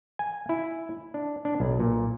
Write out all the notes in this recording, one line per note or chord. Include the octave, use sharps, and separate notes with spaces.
G#5
E4
D4
D4
B1
A#2